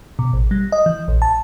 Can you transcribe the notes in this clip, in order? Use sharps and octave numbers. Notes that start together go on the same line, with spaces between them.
B2
A1
G3
D#5
E3
A#1
A5